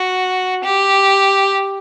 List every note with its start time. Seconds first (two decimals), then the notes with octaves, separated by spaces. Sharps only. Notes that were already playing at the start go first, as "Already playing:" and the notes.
Already playing: F#4
0.64 G4